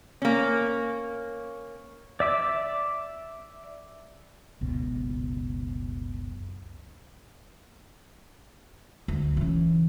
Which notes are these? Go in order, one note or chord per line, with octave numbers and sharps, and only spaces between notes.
A#3 C#4
D5 E5 D6
F#1 C#2 B2
D2
C#3 E3